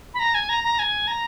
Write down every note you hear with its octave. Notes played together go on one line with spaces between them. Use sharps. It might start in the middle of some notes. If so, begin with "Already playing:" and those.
B5
A#5
G#5
A#5
A#5
G#5
A#5